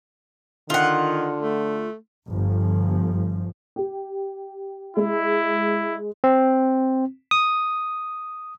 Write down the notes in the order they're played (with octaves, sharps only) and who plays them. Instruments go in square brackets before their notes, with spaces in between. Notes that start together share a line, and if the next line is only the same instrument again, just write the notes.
[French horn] D3 [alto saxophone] D#3 [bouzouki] F4 F#5
[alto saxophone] A3
[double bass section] G1 F3
[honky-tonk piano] G4
[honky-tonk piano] G#3 [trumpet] E4
[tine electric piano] C4
D#6